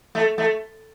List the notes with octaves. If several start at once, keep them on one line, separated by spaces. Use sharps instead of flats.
A3
A3